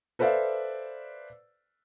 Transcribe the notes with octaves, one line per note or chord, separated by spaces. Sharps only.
A4 B4 C5 D5 E5 F5